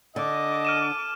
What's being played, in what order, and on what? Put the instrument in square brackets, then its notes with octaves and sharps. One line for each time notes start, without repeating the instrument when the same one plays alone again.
[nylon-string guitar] D3 [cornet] D#5 [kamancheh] A5 D6
[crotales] F6 D#7 E7